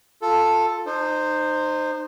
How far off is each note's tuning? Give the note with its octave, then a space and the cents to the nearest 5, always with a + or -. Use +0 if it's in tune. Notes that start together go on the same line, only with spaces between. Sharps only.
F4 +0 A4 +0
D#4 -30 C5 +0